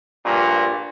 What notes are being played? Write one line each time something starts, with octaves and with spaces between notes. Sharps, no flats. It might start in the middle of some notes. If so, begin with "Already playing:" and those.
A#1 G2 A#2